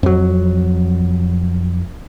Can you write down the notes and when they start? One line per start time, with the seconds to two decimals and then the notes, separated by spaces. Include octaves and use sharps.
0.03 F2 F#3